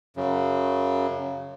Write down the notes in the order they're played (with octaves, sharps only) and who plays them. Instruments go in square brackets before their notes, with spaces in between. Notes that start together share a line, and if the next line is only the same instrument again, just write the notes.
[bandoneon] F#2 C#3